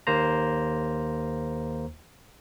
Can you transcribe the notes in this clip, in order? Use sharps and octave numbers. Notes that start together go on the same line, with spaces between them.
D#2 A#3 C5 A#5